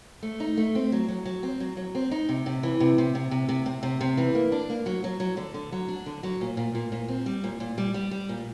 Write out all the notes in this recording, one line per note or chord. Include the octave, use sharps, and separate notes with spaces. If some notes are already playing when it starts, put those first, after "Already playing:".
A3
D#4
A3
C4
F#3
F#3
F#3
C4
F#3
F#3
C4
D#4
C3
C3
E3
C3
C3
C3
C3
C3
C3
C3
C3
E3
A#3
D4
A#3
F#3
F#3
F#3
D3
D3
F#3
D4
D3
F#3
A#2
A#2
A#2
A#2
C4
G3
A#2
A#2
G3
G3
G3
A#2